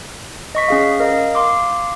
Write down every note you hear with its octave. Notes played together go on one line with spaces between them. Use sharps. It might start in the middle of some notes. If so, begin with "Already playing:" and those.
D#5 C#6 B6
C#4 G#4 F5
A#4 D#5 F5
F5 C6 D6